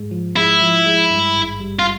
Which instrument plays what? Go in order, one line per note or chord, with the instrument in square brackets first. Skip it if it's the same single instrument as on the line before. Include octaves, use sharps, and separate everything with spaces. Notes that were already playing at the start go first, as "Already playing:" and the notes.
Already playing: [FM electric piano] G#2 G#3
F3
[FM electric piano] G#3 [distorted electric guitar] E4
[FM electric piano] F3
G#3
G2
G#1
G3
[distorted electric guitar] F4